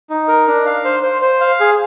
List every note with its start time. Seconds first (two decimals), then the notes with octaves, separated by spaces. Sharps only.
0.10 D#4
0.28 A#4
0.48 D4
0.66 F5
0.85 C5
1.03 C5
1.22 C5
1.41 F5
1.60 G#4